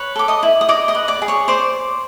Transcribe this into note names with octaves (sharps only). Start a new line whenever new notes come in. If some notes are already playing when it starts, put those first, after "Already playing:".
Already playing: B4 C#5
A4 D6
D#5 D#6
E4
D#6
D5 D#5 D6
D#5 D#6
B4
D5 D6
G#4
C#5 C#6
C5 D5 D6